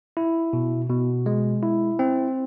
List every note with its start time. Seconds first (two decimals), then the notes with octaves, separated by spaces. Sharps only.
0.17 E4
0.53 B2
0.90 B2
1.26 G#3
1.63 E4
1.99 C4